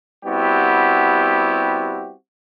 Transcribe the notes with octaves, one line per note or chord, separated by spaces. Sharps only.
G3 B3 C4 E4 F#4 G4